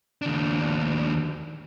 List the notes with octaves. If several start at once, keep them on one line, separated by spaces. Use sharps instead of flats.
D#2 D4